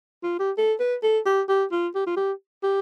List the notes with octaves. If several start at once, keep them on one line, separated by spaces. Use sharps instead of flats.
F4
G4
A4
B4
A4
G4
G4
F4
G4
F4
G4
G4